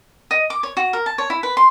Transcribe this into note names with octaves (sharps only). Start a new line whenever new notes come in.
D#5
D6
C#5
F#4
A#4
A5
C#5
E4
B4
C6